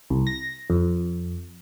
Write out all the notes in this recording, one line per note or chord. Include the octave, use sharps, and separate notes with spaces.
C2
A#6
F2